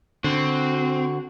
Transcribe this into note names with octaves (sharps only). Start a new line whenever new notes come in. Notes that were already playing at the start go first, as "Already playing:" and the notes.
D3 C4 F#4